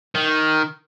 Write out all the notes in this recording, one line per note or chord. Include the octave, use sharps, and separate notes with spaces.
D#3